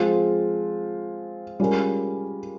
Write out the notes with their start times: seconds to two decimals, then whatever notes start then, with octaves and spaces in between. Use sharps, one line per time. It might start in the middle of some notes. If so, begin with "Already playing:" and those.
Already playing: F3 G#3 C4 F4
1.60 G3 G#3 C#4 F4 A#4